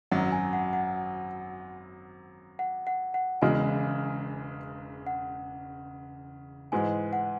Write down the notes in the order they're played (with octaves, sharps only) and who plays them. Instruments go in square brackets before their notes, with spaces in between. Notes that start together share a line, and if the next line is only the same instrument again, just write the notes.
[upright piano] G#1 F#2 F#3 [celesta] F#5
[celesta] G#5
F#5
F#5
F#5
F#5
F#5
[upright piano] E1 E2 C#3 G#3 [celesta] G#5
[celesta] F#5
[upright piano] G#2 E3 G#3 [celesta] G#5
[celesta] F#5